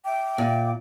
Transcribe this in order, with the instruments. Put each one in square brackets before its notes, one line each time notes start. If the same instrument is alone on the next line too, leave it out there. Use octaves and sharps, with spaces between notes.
[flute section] E5 G5 D6
[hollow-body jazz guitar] A#2